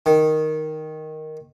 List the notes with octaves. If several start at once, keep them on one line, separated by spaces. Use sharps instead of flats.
D#3